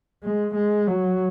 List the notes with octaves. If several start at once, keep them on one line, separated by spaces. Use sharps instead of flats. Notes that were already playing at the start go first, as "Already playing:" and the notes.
G#3
G#3
F#3